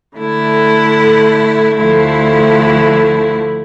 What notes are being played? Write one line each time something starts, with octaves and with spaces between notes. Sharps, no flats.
D3 A3 E4
D2 D3 F3 A3 E4